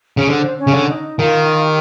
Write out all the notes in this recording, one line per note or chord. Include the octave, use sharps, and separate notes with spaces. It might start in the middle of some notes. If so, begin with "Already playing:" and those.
C#3
D3 C5
C#4 C#5
C#3
D3
D#4 D#5
D#3 F4 F5
G4 G5